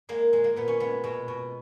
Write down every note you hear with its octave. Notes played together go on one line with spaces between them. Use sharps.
G#3 A#3
A#2 G#3
A#3
A#2 B3
C#4
G#3 B3
B2 G#3
B2